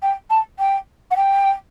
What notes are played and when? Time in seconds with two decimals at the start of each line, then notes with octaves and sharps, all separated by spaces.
0.02 G5
0.30 A5
0.59 G5
1.11 F#5
1.16 G5